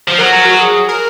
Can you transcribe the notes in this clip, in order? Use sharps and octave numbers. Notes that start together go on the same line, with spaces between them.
F3
F#3 A#4
F#4
G#4
A#4